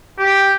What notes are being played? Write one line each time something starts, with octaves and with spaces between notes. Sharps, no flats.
G4